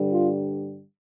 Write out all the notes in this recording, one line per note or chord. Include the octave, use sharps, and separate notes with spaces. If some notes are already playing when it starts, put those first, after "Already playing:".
Already playing: G2 D3 G3
F4